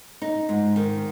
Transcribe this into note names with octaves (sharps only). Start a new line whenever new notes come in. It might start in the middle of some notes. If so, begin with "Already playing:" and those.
D#4
G#2
D#3